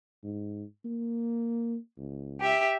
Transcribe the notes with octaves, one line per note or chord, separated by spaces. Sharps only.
G#2
A#3
C#2
G4 E5